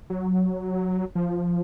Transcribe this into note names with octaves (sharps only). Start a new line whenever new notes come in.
F#3
F3